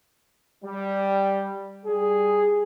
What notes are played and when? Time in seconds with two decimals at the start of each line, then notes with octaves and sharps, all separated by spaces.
0.65 G3
1.86 G3 G#4